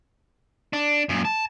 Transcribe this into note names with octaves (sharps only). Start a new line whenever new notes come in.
D4
F#2 A#2
A5